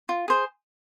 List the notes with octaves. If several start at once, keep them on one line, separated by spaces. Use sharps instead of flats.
F4
G#4 C5